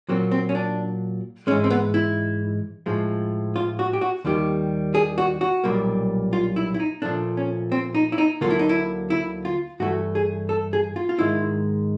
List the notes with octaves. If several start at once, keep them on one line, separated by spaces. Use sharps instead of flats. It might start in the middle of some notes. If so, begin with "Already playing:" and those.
A#2 F#3 A#3 C4
C4
C#4
D4
G#2 E3 G#3 C#4
C4
B3
E4
A2 F3 G#3
F4
F#4
G4
F#4
D#2 D#3 G3 G4
G#4
F#4
F#4
B1 A#2 G3 A#3
F4
E4
E4
D#4
A#2 F3 A3 D4
C#4
C4
D#4
E4
D#4
D2 D3 F#3 A#3 F4
E4
D#4
E4
E4
F4
G2 E3 A3 F#4
G#4
A4
G#4
F4
F4
G#2 D#3 G#3 E4